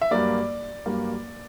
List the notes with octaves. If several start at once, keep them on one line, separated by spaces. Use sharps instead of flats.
E5
G2 F#3 A#3 D5
G2 F#3 A#3